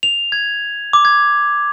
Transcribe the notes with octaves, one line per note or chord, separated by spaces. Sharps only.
F7
G#6
D6
G#6